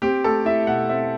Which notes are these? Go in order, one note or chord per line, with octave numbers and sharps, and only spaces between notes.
C4 G4
A3 A4
E4 E5
B2 F#5
C4 E5